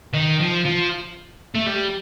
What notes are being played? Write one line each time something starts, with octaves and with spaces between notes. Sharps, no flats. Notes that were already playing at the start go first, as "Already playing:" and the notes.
D#3
F3
F3
A3
G3